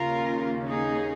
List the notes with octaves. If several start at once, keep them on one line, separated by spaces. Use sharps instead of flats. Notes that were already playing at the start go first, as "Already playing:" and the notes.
Already playing: D#2 C#3 A#3 C#4 F4 A#4
D#4 G#4